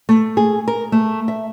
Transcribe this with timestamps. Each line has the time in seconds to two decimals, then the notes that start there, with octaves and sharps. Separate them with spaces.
0.09 A3
0.37 G#4
0.68 A#4
0.92 A3
1.28 E5